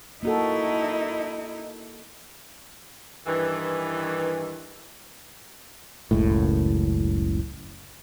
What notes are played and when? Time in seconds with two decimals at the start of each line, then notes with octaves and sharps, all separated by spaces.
0.23 A#3 D#4 E4 F#4 A4
3.27 G2 D#3 E3
6.11 F#1 C#2 A2